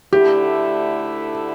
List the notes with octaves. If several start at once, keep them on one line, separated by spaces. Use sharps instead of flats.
D2 D3 A3 E4 G4